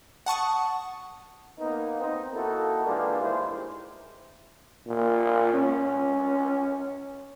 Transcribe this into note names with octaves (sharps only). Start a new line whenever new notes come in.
F#5 A5 C#6 D#6
A#3 B3 D#4
C4 D#4
A#3 D#4 E4 F#4 A4
E3 G3 G#3 A#3 D4 F4
D#2 D#3 G3 G#3 E4 C5
A#2
C#4